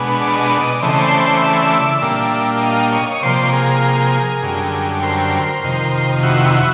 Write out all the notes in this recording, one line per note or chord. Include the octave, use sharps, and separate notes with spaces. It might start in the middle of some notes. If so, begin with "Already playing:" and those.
Already playing: B2 G#3 B3 D4
D5
D#5
D5
D#5
D5
C#3 E3 A3 C4 D#5
C5 D5
D5 E5
A#2 G3 A#3 D4
D#5 F5
C#5 D#5
D#5
C3 F3 A#3 C5 D5
G#4 A#4
F#2 D3 G3
A#4 C5
F2 C3 D#3
E4 F#4
E4 F#4